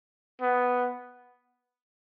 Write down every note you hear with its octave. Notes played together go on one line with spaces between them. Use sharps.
B3